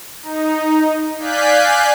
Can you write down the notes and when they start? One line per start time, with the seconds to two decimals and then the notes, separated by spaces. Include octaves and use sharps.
0.23 D#4
1.18 D5 F5 G#5 F#6 G6 B6